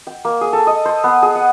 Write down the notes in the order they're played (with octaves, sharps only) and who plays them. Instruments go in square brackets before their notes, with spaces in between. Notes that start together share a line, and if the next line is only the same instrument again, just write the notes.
[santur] G5
A#3
G#4
A4
D#5
C5
B3
G#4
F#5